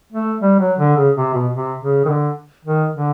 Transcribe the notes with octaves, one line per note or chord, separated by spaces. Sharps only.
A3
G3
F#3
D3
C#3
C3
B2
C3
C#3
D#3
D3
D#3
D3